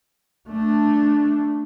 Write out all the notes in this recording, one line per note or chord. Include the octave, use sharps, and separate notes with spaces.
A3 D4